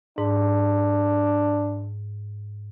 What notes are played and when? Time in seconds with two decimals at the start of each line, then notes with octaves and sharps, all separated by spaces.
0.18 G#2 D4